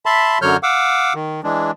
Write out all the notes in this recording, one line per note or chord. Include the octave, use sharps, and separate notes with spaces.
E5 A5 B5 C6
F#2 D3 F#3 C#5 F6 G6
F5 F#5 D6 E6
D#3
E3 G#3 D4